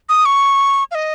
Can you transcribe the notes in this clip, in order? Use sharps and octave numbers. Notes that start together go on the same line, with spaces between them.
D#6
C#6
F5
D#5